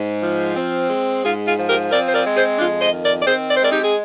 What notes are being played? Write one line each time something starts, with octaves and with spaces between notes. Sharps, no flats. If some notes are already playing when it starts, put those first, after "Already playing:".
Already playing: G#2
F3
C4
G#3
G#2 F4 G#4
F4 G#4
F3
G4 A#4
C4 A#4 D5
C5
A#4 D5
G#3
G#4 C5
F2 D4 F4
C5 D#5
D#3
A#4 D5
D5
C4 G#4 C5
D5
C5
G#3 A#4 D5
D#4 G4
G#4